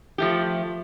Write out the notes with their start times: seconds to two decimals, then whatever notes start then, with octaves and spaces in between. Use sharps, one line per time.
0.18 F3 A3 G4